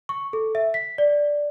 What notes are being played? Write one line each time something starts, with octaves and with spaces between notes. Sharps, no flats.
C#6
A4
E5
B6
D5